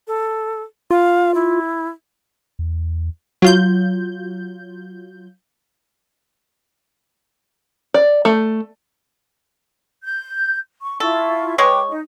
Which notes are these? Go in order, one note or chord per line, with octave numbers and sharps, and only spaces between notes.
A4
F4 F5
E4
E2
F#3 F4 G6
D5
A3
G6
C#6
E4 F4 A4 C#6
G#3 G#4 B4 C#5 G5 D6
D#4